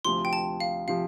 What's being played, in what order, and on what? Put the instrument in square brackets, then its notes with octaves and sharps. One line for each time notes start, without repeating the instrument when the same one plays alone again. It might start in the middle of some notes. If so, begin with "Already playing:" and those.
[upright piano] D2 C3 F3 [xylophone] C6
[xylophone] G5
A5
F5
[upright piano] C3 F3 [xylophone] F5